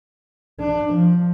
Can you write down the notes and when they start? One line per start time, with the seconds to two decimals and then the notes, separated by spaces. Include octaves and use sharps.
0.60 D4
0.94 F3